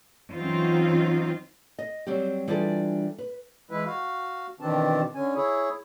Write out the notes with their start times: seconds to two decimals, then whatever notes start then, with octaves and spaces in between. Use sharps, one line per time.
0.35 E3 F#3 C4 C#4 D#4 F4
1.79 D#5
2.07 F#3 G3 C4 G4
2.48 E3 G3 D4 F4 G#4 A4
3.18 B4
3.71 E3 G#3 E4 B4
3.86 F#4 F5
4.60 B2 D#3 E3 C4 D4 A5
5.15 D3 C#4 G#5
5.36 E4 G#4 C#5